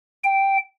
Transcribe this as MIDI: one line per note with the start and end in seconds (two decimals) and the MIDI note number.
0.24 0.57 79